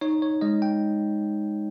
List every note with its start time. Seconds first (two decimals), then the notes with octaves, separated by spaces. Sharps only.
0.01 D#4 C#5
0.22 C#5
0.41 G#3 D#5
0.62 G5